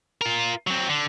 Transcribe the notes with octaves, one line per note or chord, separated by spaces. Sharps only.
F4 A#4
F#3 C4
D3